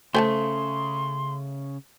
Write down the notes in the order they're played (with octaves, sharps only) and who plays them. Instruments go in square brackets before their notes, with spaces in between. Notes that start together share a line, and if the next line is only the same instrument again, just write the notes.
[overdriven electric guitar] C#3 [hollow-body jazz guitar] A3 [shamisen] C5 G#5 A5 [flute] C6